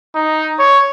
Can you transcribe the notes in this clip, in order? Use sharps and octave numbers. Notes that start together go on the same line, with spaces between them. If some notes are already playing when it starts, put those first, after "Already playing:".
D#4
C#5